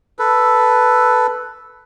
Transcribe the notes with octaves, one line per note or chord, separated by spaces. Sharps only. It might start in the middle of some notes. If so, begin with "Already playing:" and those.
A4 B4